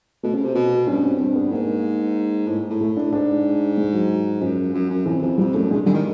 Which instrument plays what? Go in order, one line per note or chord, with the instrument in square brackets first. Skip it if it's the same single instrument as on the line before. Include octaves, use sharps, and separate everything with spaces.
[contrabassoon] B2 [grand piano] A3
[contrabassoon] C#3
C3
B2
[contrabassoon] G2 [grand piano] C#4
[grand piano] C4
[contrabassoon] G2 [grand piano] C4
[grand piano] B3
[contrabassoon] G#2 [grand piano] A#3
[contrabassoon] A2
A2
[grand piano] A3
D4
[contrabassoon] G#2 [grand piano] D4
[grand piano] G#3
F#3
[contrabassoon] F#2 [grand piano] F3
[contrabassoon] F#2
F#2
[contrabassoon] F2 [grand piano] E3
[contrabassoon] F2 [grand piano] E3
[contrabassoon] F2 [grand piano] G3
[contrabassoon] F#2 [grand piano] A3
[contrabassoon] G2 [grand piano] G#3
[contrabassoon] D3 [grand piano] G3
[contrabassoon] D#3